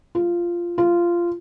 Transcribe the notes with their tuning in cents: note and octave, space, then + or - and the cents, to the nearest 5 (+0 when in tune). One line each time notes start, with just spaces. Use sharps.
F4 -10
F4 -15